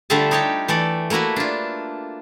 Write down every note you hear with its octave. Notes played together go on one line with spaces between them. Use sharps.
D3 G3 A3 F4 E5 A5
D#4 G4 C#5 G5 A5
E3 A3 A4 D5
A3 A#3 E4 F#4 B4
D4 F4